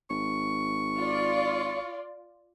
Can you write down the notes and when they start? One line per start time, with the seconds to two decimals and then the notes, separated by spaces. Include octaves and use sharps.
0.10 G#1 C#6
0.99 F4 D5